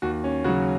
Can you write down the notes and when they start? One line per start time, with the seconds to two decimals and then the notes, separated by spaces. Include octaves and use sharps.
0.02 D#2 F#4
0.24 C#4
0.44 C#3 F#3 F#4